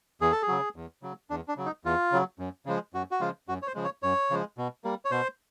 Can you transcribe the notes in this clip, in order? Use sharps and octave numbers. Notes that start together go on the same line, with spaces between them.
E2 G#4
A4
G#4
C#3 F#3
E2
C#3 F#3
E2 D4
D4
C#3 F#3
D#4
E2 F4
C#3 F#3
F#2
C#3 F3 G#3
F#2 F#4
F#4
C#3 F3 G#3 F4
F#2 F#4
C#5
C5
C#3 F3 G#3
C#5
F#2 C#5
C#3 F3 G#3
B2
G3 A#3
C#5
B2 C5